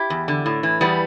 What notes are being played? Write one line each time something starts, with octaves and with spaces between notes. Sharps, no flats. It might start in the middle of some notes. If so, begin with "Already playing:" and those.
Already playing: E4 G4
E2
D3
A2
E3
E2 G3 B3